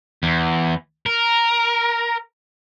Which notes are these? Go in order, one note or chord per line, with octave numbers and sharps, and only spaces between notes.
E2
A#4